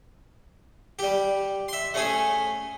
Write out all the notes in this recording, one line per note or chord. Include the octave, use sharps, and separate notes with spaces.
G3 G4
E5 C6
A3 C#4 G#4